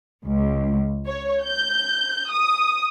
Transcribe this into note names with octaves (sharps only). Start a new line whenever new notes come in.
C#2
C#5
G6
D#6